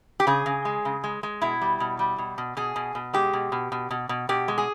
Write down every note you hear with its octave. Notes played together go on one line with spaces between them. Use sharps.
G4
C#3 G#4
C#3
G#3
C#3
G#3
G#3
B2 E4
G3
B2
G3
B2
B2
B2 G#4
B2
B2
G#3 G4
B2
B2
B2
B2
B2
B2 G4
G#3
G#4